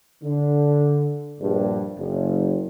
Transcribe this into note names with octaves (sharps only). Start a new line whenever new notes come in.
D3
A#1 G2
F#1